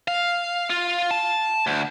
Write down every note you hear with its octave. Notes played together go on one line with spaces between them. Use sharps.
F5
F4
A5
D2